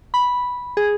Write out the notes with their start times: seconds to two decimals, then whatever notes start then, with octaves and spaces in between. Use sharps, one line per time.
0.14 B5
0.77 G#4